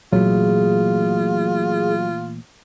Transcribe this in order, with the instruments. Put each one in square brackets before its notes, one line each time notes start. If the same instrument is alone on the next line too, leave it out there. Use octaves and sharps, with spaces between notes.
[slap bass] A#2 E3 A3 [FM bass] F#3 [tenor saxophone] F4 [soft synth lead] G#4